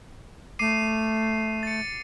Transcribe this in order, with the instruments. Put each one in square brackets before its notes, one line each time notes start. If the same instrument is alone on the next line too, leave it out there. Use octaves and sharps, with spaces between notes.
[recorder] A3 [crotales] D6 C7 D#7
[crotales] A6 C#7